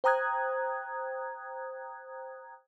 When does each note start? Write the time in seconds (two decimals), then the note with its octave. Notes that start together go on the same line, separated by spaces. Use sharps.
0.04 C5 G5 A#5 D#6 F#6 G#6